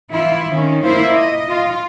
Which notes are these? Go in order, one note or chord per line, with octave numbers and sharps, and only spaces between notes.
E3 E4 F4
D#3 C#4
A#3 E4 F4 C5
D#5
F4